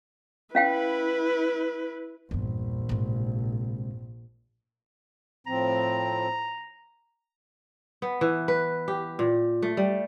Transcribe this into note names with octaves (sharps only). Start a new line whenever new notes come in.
C#4 E4 B4 F5 G5
A#1 E2 G2
G#2 C3
A2 F3 C4 A#5
B3
E3
B4
G4
A#2
A3
G3